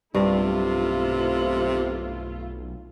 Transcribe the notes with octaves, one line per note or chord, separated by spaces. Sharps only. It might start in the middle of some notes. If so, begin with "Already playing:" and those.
B1 G2 C3 A3 E4 F4